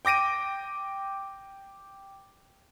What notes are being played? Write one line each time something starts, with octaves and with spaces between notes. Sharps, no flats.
G5 D6 A#6 D7 D#7